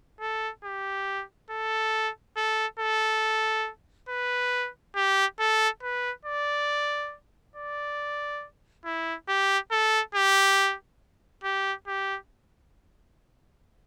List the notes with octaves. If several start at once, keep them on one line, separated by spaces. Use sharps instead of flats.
A4
G4
A4
A4
A4
B4
G4
A4
B4
D5
D5
E4
G4
A4
G4
G4
G4